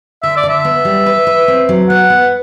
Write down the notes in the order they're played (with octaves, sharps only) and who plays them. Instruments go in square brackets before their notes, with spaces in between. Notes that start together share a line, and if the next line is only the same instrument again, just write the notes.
[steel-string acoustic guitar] D3 [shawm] E5
[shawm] D5
[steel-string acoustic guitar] D3
[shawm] E5
[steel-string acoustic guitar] B3
G3
B4
B4
C4
F#3
[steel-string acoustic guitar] B3 [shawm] F#5
[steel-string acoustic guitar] B3